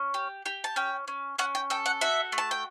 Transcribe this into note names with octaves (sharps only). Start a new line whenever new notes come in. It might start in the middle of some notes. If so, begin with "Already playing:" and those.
Already playing: C#4
G4
G4
A5
C#4 G5
C#4
C#4 F#5
G5
A4 G5
F#5
F#4 E5
A3
A5
G5